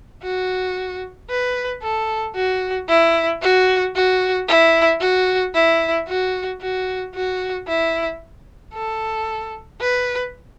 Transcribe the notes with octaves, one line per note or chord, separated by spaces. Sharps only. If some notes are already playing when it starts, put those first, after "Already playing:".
F#4
B4
A4
F#4
E4
F#4
F#4
E4
F#4
E4
F#4
F#4
F#4
E4
A4
B4